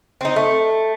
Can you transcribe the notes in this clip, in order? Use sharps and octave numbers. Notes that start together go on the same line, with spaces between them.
C4 D#4
A3